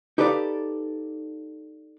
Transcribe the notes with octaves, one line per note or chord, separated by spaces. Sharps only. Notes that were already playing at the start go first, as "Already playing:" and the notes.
D#4 G4 A4 B4 D5 F5